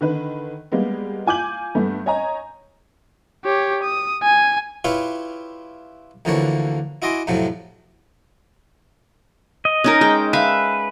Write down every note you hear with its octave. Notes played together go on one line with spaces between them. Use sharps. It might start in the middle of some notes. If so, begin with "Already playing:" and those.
D3 D#3 B4
G3 G#3 A#3 B3
F4 G#5 D6 G6 F#7
G2 A3 B3
C#5 D#5 G#5 A#5
G4 C#5
D#6
G#5
E4 F4 G4 B4 C#5 F5
D2 D3 E3 F3 A#3 C#5
E4 F#4 D#5 G#5 C6 D6
F2 A2 C3 F3 F#3
D#5
C#4 D#4 A#4
G#3 G5
B4 E5 F5